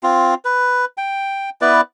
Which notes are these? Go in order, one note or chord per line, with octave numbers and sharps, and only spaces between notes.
C4 F4
B4
G5
B3 E4 B4 D5